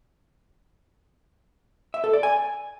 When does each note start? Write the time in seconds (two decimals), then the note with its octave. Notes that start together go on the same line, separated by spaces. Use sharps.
1.94 E5
2.04 A4
2.13 D5
2.23 G#5